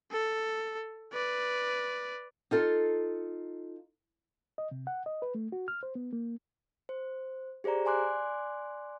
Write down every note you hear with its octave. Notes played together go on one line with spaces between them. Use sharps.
A4
B4 D5
D#4 F4 A4
D#5
C3
F#5
D#5
B4
A3
F#4
F6
C5
B3
A#3
C5
G4 G#4 C5 D5 A#5
D5 G#5 C6 D6 F#6